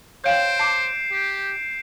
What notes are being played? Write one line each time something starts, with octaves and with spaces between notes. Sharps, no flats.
C5 C#5 F5 G5 G6 D7 E7
A5 D6 C7
G4